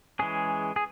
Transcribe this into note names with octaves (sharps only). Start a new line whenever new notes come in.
E3 G#3 C#4 G#4
G#4